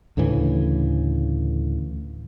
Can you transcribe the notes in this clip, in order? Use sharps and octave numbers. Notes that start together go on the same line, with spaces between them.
D2 A2 C#3 E3